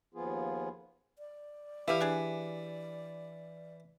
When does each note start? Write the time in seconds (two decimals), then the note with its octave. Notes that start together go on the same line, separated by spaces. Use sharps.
0.14 D#2 F3 B3 F4 G#4
1.19 D5
1.88 E3 G4 B4 E5 F5
2.01 D4 G#4